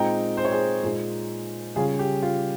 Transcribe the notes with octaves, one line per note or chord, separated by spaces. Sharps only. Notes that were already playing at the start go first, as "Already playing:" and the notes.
Already playing: A#2 G#3 C4 D#4 G5 A#5
C5
C#5
G#4 C5
A#2 G#3 D#4
C#3 G3 C#4 F4 G#4
G4
F4